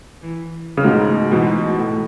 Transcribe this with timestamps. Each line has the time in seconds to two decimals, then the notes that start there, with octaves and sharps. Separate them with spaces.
0.22 E3
0.77 C#3
0.84 G#2 B2 A3
1.31 G#2 B2 E3
1.78 A2